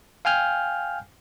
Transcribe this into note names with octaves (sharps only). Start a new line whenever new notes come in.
F5 G5 G#5 F6 G6